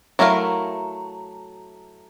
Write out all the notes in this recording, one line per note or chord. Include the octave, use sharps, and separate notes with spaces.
F#3 A3 E4 A#4 F5